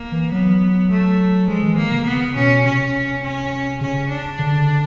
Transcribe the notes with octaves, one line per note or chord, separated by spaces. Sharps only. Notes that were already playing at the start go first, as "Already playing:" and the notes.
Already playing: A#3
E3
F#3 B3
A3
F3 G#3
E3
D#3 A#3
C#3
B3
B2 C#4
C3 C#4
C#4
C#3 C#4
D4
D3